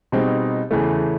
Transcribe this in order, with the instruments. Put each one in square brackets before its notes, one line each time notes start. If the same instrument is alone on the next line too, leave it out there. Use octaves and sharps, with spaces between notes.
[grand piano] B2 G3 C4 D#4 G#4
E2 C#3 E3 A3